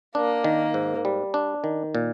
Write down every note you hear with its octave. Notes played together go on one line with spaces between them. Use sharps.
A#3 D4
D#3
G#2
G3
D4
D#3
A#2